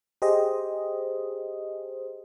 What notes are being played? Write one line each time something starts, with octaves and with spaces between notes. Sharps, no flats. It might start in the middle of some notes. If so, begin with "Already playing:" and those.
G4 G#4 C5 D#5